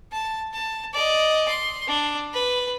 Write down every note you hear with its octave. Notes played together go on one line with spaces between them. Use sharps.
A5
A5
D5 D#5
C6
D4
B4